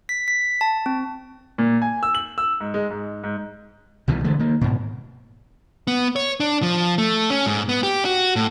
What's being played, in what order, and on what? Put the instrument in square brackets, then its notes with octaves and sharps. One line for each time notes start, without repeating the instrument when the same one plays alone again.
[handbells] B6
B6
A5
C4
[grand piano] A#2
G#5
E6
F#7
E6
G#2
G#3
G#2
G#2
[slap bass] C2 B2 D#3 E3
D3 E3 G#3 A3
D#3 A#3
G#2 B2
[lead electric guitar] B3
C#5
D4
F3
A3
C#4
G#2
B3
G4
F#4
A2